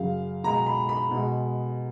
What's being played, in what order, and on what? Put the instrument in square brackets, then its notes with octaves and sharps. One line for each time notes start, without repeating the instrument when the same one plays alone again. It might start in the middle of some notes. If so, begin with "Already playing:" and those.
Already playing: [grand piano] F#2 C#3 F#3 F5
B2 G#3 A#5
B5
B5
B2 G#3